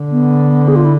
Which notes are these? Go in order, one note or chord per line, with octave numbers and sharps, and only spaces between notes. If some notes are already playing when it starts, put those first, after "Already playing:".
Already playing: D3
B3
G#4
F4
E4